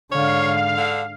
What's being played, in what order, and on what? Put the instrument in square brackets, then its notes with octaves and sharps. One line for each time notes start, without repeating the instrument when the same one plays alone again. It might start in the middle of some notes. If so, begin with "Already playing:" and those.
[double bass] G#2 D3 [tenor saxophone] C#5 [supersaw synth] F5
[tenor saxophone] D3